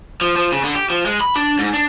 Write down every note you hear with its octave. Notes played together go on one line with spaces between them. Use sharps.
F3
F3
C#3
D3
G4
F3
G#3
B5
D4
G#2
D4